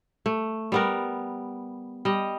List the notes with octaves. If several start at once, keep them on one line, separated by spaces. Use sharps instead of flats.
A3
G3 B3 A#4
G3 D#5